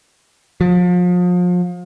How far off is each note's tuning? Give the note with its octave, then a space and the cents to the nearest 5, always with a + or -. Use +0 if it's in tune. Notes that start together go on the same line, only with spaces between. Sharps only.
F3 +35